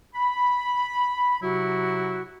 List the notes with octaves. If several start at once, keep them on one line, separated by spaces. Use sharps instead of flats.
B5
C3 F#3 E4 F#4